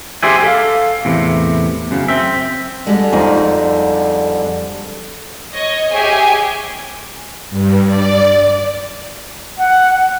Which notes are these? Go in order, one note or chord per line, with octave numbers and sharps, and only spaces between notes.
G4 G#4 C5 D5 E5 G#5
A4 F5
E2 A2 C3
F#2 C#3
C4 E5
D3 G3 G#3
F2 D#4
C#5 D#5
G4 G#4 C#5 E5 G#5
G2
D5
F#5